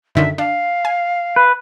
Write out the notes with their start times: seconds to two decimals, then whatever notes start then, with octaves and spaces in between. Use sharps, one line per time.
0.15 F#2 D3 D#3 E5
0.38 D4 F5
0.85 G#5
1.36 B4